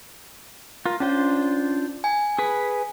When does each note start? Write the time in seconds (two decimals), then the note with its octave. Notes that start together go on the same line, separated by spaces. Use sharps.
0.86 F4 A#4
1.00 C#4 D4 F4 C5
2.04 G#5
2.39 G#4 B4 B5